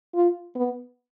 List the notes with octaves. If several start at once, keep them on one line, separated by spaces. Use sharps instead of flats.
F4
B3